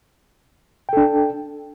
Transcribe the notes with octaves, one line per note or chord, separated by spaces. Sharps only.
D4 A4 G5